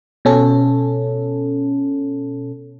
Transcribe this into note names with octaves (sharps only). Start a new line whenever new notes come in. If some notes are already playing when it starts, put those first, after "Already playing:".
B2 C#4 A4